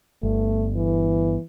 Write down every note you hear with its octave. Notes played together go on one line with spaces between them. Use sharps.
G1 A3
E3